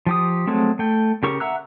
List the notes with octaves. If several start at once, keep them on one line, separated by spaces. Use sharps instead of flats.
F3 G4 D#6
F#3 G#3 A3 C4
A3 G5
C#3 G4 A#4 C#6
E5 F#5 A#5 E6 F#6